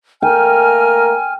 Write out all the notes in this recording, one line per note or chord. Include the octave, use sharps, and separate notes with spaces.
A3 A#3 A#4 G5 G#5 F6